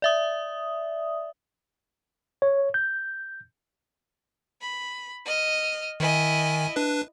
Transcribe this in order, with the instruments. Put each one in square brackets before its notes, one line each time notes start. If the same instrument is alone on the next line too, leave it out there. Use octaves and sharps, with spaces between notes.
[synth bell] D5 E5 D#6
[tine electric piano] C#5
G6
[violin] B5
D#5 F6
[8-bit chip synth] D#3 G#5 [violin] E4 D#5
[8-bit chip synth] D4 B4